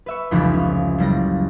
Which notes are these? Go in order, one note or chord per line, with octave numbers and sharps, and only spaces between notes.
B4 E5 C#6
F1 C#2 E3 F3 B5
C#4
F#1 C#3 G3 A6 A#6